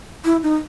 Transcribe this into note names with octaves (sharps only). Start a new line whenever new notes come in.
E4
D#4